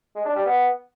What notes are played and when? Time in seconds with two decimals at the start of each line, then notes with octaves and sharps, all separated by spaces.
0.15 G#3
0.25 D4
0.36 G3
0.46 B3